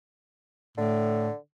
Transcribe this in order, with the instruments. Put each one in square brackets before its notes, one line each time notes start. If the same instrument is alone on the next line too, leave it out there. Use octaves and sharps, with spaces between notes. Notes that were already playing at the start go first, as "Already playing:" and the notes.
[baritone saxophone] A2 [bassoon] D3